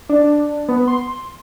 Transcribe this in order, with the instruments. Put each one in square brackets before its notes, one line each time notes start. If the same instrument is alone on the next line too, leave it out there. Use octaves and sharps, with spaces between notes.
[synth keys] D4
B3
C6